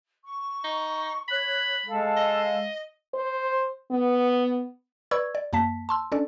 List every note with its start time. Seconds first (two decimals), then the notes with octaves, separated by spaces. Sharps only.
0.24 C#6
0.64 D#4
1.28 C#5 B5 F#6
1.86 G#3 A4 F5
2.17 D#5
3.14 C5
3.91 B3
5.11 B4 D5 B5 C#6 E6 G#6
5.35 D5
5.53 F#2 A#3 A5 B6
5.89 A5 C6 E6
6.12 C#4 D4 A4 D5